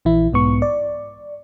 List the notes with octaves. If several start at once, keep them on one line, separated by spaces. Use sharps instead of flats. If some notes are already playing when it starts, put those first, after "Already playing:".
A#1 E3 E4
B1 G#2 B3 C#6
D5